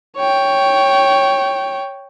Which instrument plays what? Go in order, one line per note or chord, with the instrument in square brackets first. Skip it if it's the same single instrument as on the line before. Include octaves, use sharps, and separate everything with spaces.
[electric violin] C#5 G5